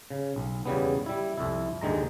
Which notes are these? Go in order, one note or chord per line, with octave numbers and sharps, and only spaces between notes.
C#3
B1
E2 C#3 G3 B3
G3 E4
C2 F2 E4
D#2 D3 D#3 G#3 A#5